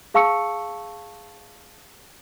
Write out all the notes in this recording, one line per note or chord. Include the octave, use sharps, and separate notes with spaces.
G#4 F5 A5 C#6 E6 C#7